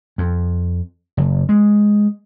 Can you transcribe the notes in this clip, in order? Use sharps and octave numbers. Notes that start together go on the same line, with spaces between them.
F2
F#1
G#3